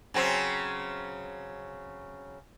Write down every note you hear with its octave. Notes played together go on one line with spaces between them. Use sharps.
C#3 F#3 C4